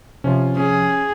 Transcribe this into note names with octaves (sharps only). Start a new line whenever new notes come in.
C3 F3 C#4 F4
C#4 G#4